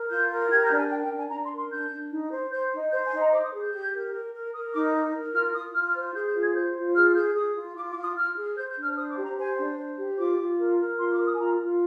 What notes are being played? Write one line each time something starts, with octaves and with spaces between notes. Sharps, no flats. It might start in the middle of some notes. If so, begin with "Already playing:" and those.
Already playing: A#4
F4 G6
A#4
G4 G#6
G6
D4
G#5
A#4 G5
G5
D4
G#5
D4 A#5
C6
A#4
C6
D4 G6
D4
D#4
C5
C5 G6
D#4
C5 G6
G#5
D#4
A#5
C5 D6
D#6
G#4
G6
G4
A#4
A#4
A#4
A#4 D#6
D#4 D6
A#4
A#4
F4 F6
F4 D#6
F4 F6
F6
C5
G#4 G6
G6
F4
G#6
C5 G6
F4
G#4 F6
G#4 G6
G#4 D#6
F4
F4 D6
D6
F4
D#6
F4 F6
G#4
C5 G6
G6
D4
F6
C5 D#6
D6
G4
A#5
C5 G#5
D4
C5
G4
F4 D6
F4
A#4
A#4
F4 C6
D6
A#4
D#6
G#5
F4 A#5
F4